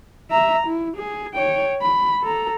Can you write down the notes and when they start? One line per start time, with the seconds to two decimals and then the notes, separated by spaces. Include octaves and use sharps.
0.31 E5 A#5
0.67 E4
0.97 G#4
1.35 C#5 G5
1.81 B5
2.21 A4 A#5